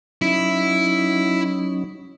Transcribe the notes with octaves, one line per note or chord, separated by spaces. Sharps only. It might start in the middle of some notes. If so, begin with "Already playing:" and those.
F#3 C#4 D#4 E4